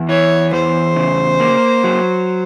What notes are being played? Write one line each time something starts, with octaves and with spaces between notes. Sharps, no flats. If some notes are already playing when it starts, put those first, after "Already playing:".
Already playing: E2
E3 C#5
E2 C5
C#3
A#3
F#3